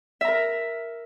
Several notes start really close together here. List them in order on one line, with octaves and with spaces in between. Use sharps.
E5 A#5 A#4